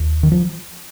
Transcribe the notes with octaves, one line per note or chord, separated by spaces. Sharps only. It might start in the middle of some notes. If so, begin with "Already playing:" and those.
Already playing: D#2
D#3
F3